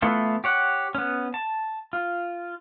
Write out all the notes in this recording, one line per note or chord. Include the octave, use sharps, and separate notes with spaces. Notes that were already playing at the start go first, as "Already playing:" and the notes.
E3 A3 B3 E4 F4
G4 C#5 F#5
B3 C#4
A5
F4